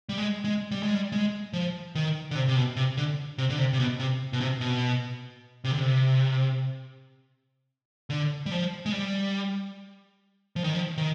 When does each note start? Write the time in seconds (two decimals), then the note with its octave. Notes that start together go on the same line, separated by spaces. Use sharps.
0.09 G3
0.17 G#3
0.44 G#3
0.71 G3
0.83 G#3
0.95 G3
1.12 G#3
1.53 F3
1.95 D#3
2.31 D3
2.36 C3
2.48 C3
2.56 B2
2.76 C3
2.97 D3
3.38 C3
3.50 D3
3.58 C3
3.73 C3
3.79 B2
3.99 C3
4.33 B2
4.41 C3
4.61 B2
5.64 C3
5.71 D3
5.78 C3
8.10 D3
8.46 G3
8.51 F3
8.86 G#3
8.92 G3
10.56 F3
10.64 D#3
10.74 F3
10.98 D#3